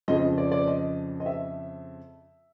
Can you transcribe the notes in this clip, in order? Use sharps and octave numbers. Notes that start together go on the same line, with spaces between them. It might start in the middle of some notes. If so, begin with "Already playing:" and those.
F2 C#3 F3 D#5
D5
D5
D#5
D#5
E5